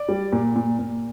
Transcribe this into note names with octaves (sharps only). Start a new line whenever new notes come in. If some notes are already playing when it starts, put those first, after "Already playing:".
Already playing: D5
G3
A#2
A#2
A#2